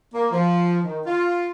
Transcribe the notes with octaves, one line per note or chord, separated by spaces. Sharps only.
A#3
F3
D#3
F4